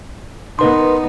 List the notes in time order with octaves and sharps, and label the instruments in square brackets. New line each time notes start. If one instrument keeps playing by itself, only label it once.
[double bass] B3 D#4 [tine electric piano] A#4 B4 C6